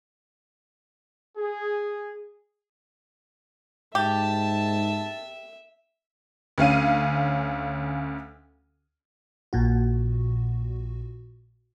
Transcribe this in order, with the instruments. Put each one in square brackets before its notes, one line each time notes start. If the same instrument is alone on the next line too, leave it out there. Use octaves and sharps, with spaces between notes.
[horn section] G#4
[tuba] G#2 [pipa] G4 [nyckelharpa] E5 [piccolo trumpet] A5
[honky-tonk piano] D2 C#4 F5 D#7
[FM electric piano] A#1 A#2 F#4